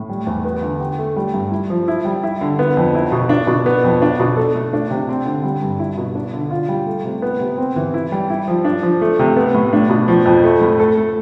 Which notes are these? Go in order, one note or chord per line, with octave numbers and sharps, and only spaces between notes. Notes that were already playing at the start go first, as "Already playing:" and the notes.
Already playing: A2
G3
E2
B3
D3
G4
A3
G3
G2
E4
F3
E4
G3
E4
D3
B3
F2
E4
B2
D4
B2
B3
F2
D4
B2
A4
A3
D4
C3
C4
D3
G3
G2
E4
B2
D4
D3
F4
G3
A3
C3
B3
C3
C4
E3
E4
G3
E4
F3
D4
F3
A3
C3
B3
A2
D4
B2
F3
F2
A3
A2
A4
A3